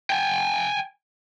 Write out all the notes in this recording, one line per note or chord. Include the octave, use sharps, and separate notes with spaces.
G5 G#5